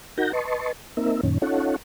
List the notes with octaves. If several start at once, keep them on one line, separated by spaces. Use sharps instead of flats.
D#4 F#4 A#4 F#5 G6 A#6
B4 D#5 A5 C6 C#6
A#3 C4 D#4 A#4 E5
F#2 A#2 D#3 C#4
C#4 D#4 F4 A4 C#5 F#5